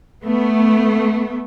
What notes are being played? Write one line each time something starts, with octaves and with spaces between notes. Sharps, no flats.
A3 B3